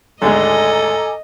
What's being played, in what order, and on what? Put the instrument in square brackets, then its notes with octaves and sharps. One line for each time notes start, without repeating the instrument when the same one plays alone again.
[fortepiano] G#1 D2 G#3 [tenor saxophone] A4 [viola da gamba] D#5 [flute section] G#5 A#5 D6